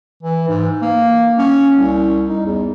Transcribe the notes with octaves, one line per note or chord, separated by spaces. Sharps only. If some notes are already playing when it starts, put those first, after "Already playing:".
E3
G#2
A#3
C#4
C2
D#4
E2